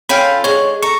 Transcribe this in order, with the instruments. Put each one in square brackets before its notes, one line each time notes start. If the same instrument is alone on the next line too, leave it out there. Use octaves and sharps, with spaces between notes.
[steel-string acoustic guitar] C#4 F4 A4 [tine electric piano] F5 G5 B5
[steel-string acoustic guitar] D3 G#3 [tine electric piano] C#5
[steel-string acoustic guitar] A4 A#5 [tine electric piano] C#6